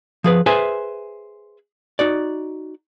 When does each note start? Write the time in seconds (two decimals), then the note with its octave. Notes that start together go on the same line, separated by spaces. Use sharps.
0.24 F3 G#4 B4
0.46 G#4 B4 C5 E5 G#5
1.99 D#4 F#4 D5